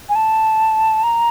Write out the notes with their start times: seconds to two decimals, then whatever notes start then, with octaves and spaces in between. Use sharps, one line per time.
0.09 G#5
0.15 A5
1.04 A#5